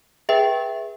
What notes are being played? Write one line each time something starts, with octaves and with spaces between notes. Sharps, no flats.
G#4 B4 E5 G5